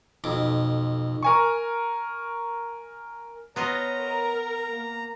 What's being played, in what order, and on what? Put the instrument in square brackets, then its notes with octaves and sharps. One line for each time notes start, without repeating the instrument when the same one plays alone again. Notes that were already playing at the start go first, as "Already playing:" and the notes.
[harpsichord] B1 F2 D6
[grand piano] A#4 G#5 C#6
[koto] B3 F4 D#5 [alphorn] C#5 [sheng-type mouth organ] A#5
[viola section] A#4
[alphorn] A#3